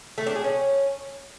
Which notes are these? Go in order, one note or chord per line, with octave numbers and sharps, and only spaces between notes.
A3
D4
G#4
C#4